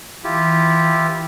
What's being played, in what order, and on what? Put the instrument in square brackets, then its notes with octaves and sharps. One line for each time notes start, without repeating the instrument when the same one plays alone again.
[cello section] E3 [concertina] E4 F4 G4